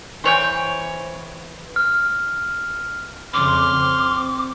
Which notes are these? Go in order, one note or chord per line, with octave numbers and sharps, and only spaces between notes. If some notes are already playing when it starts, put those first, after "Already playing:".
E3 C5 C#5 G5
F6
F2 C#3 C6 D6 F6
C4